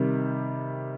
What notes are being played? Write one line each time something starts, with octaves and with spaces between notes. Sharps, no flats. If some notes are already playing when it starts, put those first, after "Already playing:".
Already playing: C3 D#3 G3